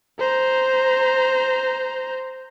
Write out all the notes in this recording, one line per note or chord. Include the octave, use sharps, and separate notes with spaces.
C5 A#5